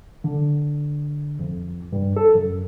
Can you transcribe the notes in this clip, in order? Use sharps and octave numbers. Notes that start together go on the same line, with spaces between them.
D3
F2
G2
A4
F#2